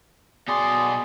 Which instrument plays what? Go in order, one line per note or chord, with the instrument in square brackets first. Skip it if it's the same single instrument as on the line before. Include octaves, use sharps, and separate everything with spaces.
[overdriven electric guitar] B2 C6 [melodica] G#4 D5